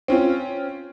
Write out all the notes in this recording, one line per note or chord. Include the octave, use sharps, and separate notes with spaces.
C4 C#4 F4